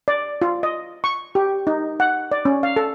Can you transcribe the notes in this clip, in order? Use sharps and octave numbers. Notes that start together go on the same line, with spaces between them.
D5
F4
D#5
C#6
G4
D#4
F#5
D5
C#4
F5
A4